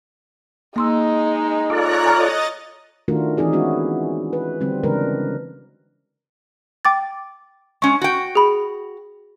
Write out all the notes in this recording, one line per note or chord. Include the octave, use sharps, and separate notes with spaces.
G#3 A#3 D#4 C6 E6
F4 A4 C#5 D5 A#5 F#6
D#5 G#5 A#5 F6 A6
D#3 A3 D4 F4 F#4 A#4
E3 C4 D#4 G#4 D5
G#3 B3 C#4 E4 F#4
B4
D3 G3 C4
C#3 E3 G#3 D4 A#4 B4
G5 D6 A6
G#3 C#4 C#6
F#4 G5
G#4 B5